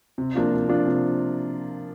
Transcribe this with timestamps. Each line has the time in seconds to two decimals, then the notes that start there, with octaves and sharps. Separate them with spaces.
0.18 C3
0.35 F3 A#3 D4 F4
0.52 C3
0.69 F3 A#3 D4 F4
0.86 C3